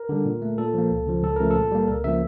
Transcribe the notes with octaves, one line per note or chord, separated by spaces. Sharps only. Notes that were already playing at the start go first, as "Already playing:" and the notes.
Already playing: A#4
D3 G3
A#2
A3
A#2 A4
F3 A#3
C#2
C#3 F3
C#2 A4
C#3 F3 A3 A#4
A4
A#2
G3 A#3
C#2 A#4
C#3 F3 A#3 E5